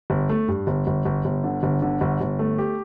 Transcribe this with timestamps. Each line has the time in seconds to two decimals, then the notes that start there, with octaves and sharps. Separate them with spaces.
0.10 G1
0.30 A3
0.48 G2
0.67 G1
0.87 G1
1.05 G1
1.25 G1
1.44 D3
1.63 G1
1.82 D3
2.01 G1
2.21 G1
2.39 A3
2.58 G4